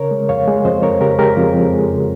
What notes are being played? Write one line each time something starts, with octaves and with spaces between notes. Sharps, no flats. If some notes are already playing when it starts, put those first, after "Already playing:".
Already playing: C#3 A#4 C#5
G#3
F2 C#5 F5
G#3
F2 C5 D#5
F2 A#4 C#5
C#3 G4 A#4
G#3 G4 A#4
F2 F4 G#4
F2
G#3
C#3